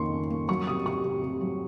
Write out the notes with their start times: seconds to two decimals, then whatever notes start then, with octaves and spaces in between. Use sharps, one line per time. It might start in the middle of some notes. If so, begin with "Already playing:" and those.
Already playing: F2 D#3 A#3 C#4 C6 C#6
0.12 C#4
0.31 A#3
0.49 F#3 C#6
0.67 C3 D#6
0.86 C3 C#6
1.04 C3
1.23 C3
1.41 F#3